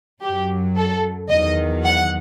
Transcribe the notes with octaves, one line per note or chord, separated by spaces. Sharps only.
F#2 F#3 G4
A4
E2 D#3 F#3 D#5
F#5